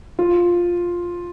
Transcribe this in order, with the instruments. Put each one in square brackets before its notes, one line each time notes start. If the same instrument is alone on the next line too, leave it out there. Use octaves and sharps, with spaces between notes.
[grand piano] F4